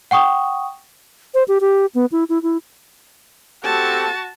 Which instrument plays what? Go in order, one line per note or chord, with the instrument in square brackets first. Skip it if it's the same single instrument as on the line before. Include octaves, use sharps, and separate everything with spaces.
[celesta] F#5 G5 C#6 D#6
[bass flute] C5
G4
G4
B3
E4
E4
E4
[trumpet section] C4 G4 A4 [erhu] F#4 [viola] A5